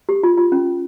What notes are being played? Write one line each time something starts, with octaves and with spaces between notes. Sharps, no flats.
G4
F4
F4
C#4